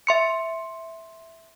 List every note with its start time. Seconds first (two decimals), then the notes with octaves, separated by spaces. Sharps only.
0.07 E5 C6 C#7